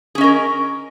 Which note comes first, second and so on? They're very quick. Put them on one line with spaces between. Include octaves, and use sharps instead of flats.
G#4 C#4 D#5 A#4